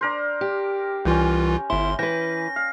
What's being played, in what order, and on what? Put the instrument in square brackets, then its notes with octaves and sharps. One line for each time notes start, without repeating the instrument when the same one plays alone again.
[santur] D4 A#4 C5
[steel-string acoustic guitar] G4
[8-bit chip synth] C2 E3 F4 [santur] C#4 G5
[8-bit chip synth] G1 C6 [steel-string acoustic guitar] E4
[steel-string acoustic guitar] E3 B4 [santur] G5 [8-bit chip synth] A#6
[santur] F5